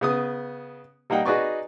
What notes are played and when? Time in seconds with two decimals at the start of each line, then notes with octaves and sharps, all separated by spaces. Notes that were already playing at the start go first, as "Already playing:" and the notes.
0.01 C#3 B3 D#6
1.10 G3 A#3 D#4 F#5 G5
1.25 D#4 F#4 G#4 B4 D5 C#6